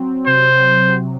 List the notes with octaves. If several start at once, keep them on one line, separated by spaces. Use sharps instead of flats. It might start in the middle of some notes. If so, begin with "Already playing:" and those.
Already playing: F#3 C4
C3 C5
C4
C3